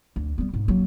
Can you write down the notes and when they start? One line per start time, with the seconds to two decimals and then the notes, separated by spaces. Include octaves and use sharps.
0.16 D2
0.38 G3 B3
0.53 G#2
0.68 F#3 A#3